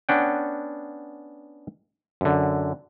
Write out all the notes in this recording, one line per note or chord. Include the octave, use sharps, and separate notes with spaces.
B3 C#4 D4 F#5 G5
F#2 D3